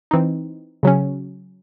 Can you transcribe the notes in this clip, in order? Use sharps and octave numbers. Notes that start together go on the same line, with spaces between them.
E3 C4 D#4
C#3 F#3 C#4